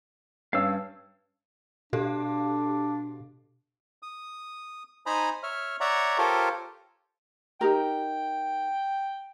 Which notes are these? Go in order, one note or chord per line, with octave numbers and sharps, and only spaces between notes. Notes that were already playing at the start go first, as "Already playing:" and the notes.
G2 C#4 F5 E6
B2 D4 G4 A4 F5
D#6
D#4 C5 G#5 A#5 B5 D#6
C#5 E5 F6
C#5 D5 E5 F#5 A#5
F4 G4 A4 A#4 C5 C#5
D#4 G4 A#4 G5